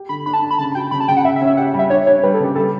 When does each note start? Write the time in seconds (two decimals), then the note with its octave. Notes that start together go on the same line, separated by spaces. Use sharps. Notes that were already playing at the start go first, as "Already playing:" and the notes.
Already playing: G4
0.09 D3 B5
0.26 D4 B5
0.33 A5
0.42 D4
0.51 B5
0.58 C#3 A5
0.75 F#4 G5
0.91 C#3 B5
1.00 A5
1.08 C#3 G5
1.17 F#5
1.24 C#3 E5
1.36 E5
1.41 C#4
1.47 E5
1.57 G4 F#5
1.74 G3
1.79 E5
1.90 D4 C#5
2.06 D4 C#5
2.23 G3 B4
2.34 A4
2.40 C#3 G4
2.55 G3 A4